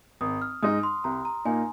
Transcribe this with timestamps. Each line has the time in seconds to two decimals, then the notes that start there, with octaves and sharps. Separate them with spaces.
0.21 G#1 D#6
0.42 F6
0.63 G#2 G#3 D#4 D#6
0.83 C6
1.04 C2 A#5
1.25 A#5
1.45 A#2 A#3 D#4 G#5